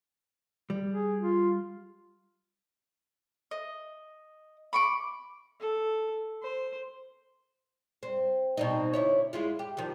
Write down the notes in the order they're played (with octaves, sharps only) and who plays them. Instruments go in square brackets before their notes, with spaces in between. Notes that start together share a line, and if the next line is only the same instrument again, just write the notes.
[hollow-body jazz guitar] G3
[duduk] G#4
F4
[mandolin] D#5
B5 C#6 D6
[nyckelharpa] A4
C5
[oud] C4
B2 C4 D#4
D2 E4 C#5
G#3 E4 F4
G4
D#3 F3